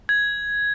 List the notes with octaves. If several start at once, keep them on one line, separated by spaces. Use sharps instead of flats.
G#6